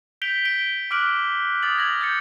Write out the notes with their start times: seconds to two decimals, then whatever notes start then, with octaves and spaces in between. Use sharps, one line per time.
0.22 G6 B6 D7 F7 G7
0.45 D7 G7
0.91 D6 F6 F#6 D7 F#7
1.63 D#6 A6 F#7
1.77 G#6 A#6 F#7
2.01 G6 A6 C#7